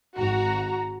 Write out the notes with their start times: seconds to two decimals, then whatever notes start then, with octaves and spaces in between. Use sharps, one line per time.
0.16 G#1 F#4 A#5